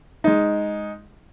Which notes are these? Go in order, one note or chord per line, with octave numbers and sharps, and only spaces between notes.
G#3 D#4